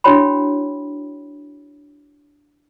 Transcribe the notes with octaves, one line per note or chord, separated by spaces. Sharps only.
D4 E4 F#4 C#5 G5 B5